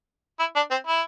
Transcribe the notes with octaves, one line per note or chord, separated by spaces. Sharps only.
E4
D4
C4
E4